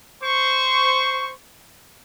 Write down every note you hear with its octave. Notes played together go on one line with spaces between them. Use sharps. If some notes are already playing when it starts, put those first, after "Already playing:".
C5 C#6